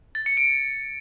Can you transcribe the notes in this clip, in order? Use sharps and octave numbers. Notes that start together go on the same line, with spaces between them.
A6
C#7
D7